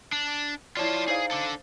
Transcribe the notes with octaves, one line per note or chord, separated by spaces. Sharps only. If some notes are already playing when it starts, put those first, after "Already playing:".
D4
E4 F4 C#5 D5 A5
D#4 G#4 C5 F5
D4 A4